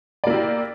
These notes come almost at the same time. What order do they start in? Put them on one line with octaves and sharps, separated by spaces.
D5 A#3 E4 G4